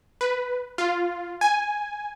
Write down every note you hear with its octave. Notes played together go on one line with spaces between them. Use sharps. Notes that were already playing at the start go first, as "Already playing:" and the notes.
B4
F4
G#5